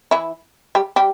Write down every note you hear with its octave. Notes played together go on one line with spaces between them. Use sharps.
E3 E4
G3 G4
G3 G4